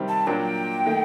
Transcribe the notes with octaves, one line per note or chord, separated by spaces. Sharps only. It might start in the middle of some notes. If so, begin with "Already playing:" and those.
Already playing: C3 D#3 G3 C4
A5
A#2 F#3 A#3 D4 G5
D#3 A3